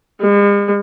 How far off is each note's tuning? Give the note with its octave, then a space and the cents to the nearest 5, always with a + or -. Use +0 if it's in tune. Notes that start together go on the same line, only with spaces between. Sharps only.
G#3 -45